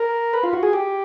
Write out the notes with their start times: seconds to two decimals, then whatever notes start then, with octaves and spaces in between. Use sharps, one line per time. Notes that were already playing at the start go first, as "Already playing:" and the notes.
Already playing: A#4
0.33 B4
0.43 F4
0.53 F#4
0.63 G#4
0.73 G4